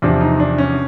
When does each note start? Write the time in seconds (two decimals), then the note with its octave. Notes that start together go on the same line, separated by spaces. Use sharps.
0.02 E2 C3 F3 D4
0.21 D#4
0.40 D4
0.58 C#4